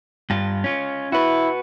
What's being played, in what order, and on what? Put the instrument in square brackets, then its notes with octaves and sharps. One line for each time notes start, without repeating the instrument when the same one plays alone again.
[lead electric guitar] G2 F4
C#4 F4
[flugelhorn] E4 [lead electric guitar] F#4 B4